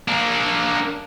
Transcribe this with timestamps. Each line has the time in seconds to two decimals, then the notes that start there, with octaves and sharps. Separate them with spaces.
0.08 A#3 D4